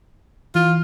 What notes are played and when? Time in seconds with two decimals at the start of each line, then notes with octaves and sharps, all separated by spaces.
0.55 E3 F4